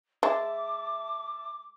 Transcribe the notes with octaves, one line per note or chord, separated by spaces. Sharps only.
G#3 E5 A5 D6